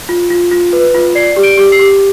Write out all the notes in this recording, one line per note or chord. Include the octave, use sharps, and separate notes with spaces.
F4
F4
F4
B4
F4
D5 C7
G4
D7
G4
C7
G4